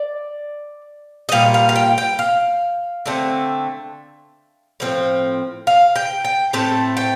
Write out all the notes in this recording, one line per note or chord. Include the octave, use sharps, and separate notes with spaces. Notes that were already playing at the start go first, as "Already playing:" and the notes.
Already playing: D5
D#5
A#2 G3 F5
F5
F5
G5
G5
F5
D3 A3 C4
A2 F3 C4
F5
G5
G5
A2 A3 C4 A5
G5